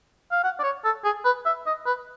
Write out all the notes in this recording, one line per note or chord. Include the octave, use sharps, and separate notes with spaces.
F5
F#5
D5
C#5
A4
G#4
B4
E5
D#5
B4